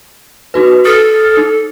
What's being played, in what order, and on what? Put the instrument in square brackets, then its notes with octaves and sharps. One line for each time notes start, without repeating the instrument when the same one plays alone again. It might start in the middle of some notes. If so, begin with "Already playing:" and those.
[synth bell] D#4 F#4 B4
[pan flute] A4 [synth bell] D#6 F6 A6
[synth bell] D#4